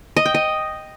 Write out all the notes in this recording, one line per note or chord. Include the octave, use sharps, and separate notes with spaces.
D#5
G5
D#5